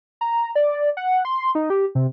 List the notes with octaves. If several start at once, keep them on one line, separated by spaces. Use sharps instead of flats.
A#5
D5
F#5
C6
D#4
G4
C3